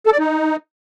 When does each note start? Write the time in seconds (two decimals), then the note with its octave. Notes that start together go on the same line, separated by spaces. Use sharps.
0.06 A4
0.13 D5
0.19 D#4